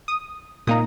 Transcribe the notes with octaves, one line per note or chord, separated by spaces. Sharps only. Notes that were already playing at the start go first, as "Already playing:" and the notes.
D#6
A#2 A#3 D#4 D#6